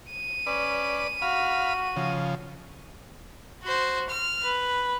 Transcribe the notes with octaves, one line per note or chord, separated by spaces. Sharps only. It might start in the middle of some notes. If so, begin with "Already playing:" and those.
D#7
C#4 B4 D5
F#4 F5 B5
C#3 F3
F#4 C5
F6
B4